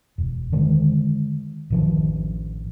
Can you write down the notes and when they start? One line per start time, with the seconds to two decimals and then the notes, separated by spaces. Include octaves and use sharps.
0.18 E1
0.52 D3 D#3 G#3
1.70 A1 D#3 F3